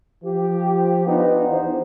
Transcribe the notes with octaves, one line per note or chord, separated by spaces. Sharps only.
F3 G4
B3 D4 D#4 F4
E2 C5